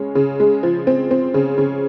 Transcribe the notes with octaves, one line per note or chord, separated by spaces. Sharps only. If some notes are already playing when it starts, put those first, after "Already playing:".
Already playing: C#3 G#3 C#4
C#3
G#3
F3
C4
C4
C#3
C#3